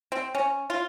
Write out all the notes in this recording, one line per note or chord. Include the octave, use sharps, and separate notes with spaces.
C4
C#4
F4